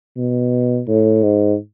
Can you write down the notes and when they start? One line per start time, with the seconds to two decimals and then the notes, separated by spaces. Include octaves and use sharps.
0.17 B2
0.88 A2
1.23 G#2